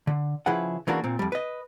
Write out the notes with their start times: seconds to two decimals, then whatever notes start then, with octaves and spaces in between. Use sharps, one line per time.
0.07 D3
0.46 C#3 F3 E4 G#4 B4 F#5
0.87 C#3 E3 A#3 D4 F#4
1.04 A#2 C4
1.19 F2 G3
1.32 B4 D#5